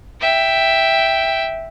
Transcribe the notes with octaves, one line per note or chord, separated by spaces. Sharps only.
E5 G5